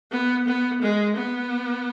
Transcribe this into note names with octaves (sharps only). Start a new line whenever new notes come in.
B3
B3
G#3
B3